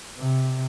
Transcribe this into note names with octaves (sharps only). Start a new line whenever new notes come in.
C3